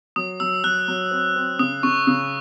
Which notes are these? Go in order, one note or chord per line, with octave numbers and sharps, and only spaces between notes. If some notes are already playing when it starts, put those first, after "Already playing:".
F#3 D#6
F#3 E6
F#3 F#6
F#3
C4
C4
C#3 D#6
C#3 C#6
C#3 D#6